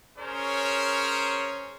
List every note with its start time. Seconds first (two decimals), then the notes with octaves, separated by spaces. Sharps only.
0.19 C#4 G#4 A#4 C5 C#5